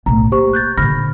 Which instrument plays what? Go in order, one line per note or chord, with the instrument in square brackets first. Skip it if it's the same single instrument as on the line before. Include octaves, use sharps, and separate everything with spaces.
[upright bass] B1 A2 [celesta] A#5
[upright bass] A#3 [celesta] G4 C5 C#6
[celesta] F#6 G6 A6
[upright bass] A#2 D3 [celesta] B5 F6 A#6